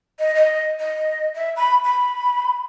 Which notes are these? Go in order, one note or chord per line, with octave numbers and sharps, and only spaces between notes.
D#5
D#5
D#5
E5
B5
B5